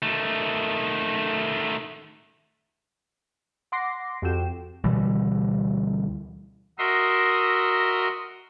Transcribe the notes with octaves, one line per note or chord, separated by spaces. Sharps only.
D#3 A3
F#5 C6 D6 A#6 C7
F2 F#4 G4 A4 G5 E7
D2 B2 E3 G3
F#4 A#4 D#5 E5 C6